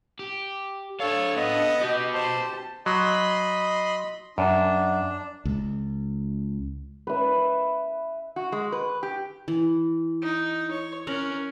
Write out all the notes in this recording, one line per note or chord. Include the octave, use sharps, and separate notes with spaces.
G4
D4 A4 C#5 F5
B3 D#5
F#4 G4 B4
C5 A5
F#3 D#5 B5 C6
F#2 D4
C#2
B4 E5
F#4
G#3
B4
G4
E3
D#4
C#5
C#4 A#4 F#5 A#5